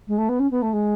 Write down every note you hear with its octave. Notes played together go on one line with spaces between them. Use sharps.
G#3
A3
B3
C#4
B3
A3
G#3